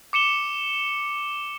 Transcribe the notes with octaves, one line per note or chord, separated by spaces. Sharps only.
D6 C#7 E7 G7